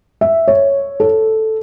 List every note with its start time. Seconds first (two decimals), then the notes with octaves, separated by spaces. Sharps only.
0.21 E5
0.48 C#5
1.00 A4